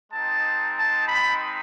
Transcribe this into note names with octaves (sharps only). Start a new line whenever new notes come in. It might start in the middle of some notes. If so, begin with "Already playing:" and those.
G#3 C4 D#4 A5
A5
B5